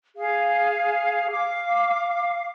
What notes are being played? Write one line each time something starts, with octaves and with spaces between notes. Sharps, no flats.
G#4 F5
F5 D6